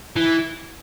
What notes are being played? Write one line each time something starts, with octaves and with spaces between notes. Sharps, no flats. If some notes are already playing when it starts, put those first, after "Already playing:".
E3